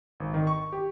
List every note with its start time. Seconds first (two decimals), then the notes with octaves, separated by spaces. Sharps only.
0.20 G#1
0.34 D#3
0.47 C#6
0.73 G4